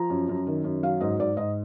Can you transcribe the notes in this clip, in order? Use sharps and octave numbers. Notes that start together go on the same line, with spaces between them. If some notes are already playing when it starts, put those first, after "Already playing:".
Already playing: F3 A#5
F#2
F#2
D#3
F#2
F#3 F5
G#2 D#5
G#2 D5
G#2 D#5